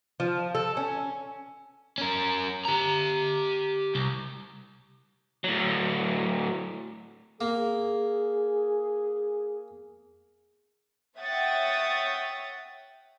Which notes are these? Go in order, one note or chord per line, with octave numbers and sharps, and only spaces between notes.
F3
A4
C#4
C#4 A#4
G4 A#5
C2
A2 F#3
A#3 G#4
C#5 E5 F#5 G5 D#6 A6